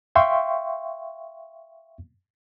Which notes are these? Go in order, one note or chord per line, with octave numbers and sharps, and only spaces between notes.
E5 F5 G5 C6 C#6